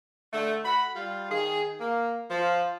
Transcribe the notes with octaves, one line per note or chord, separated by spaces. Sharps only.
D3 A3
F#4 B5
G3 F4
D#3 G#4
A#3
F3